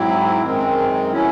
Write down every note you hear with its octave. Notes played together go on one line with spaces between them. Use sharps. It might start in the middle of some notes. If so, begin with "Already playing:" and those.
Already playing: G#2 F#3 C4 E4
F#2 D#3 G#3 C4
A2 F#3 C#4 E4